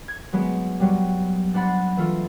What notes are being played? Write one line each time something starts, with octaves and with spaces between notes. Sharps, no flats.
G#6
F#3 G#3 B3 G#4
F#3 G3
D4 C5 F#5 B5 A6
E3 A3 F4